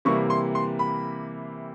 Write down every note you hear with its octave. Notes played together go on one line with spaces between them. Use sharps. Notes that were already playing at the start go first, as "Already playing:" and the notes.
C3 E3 G3 A#3 C#6
C6
C6
B5